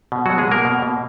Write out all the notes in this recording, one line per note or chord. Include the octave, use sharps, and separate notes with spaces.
B2
B2 F#3 F#4
G#3 G#4
B2 A#3 A#4
B2
B2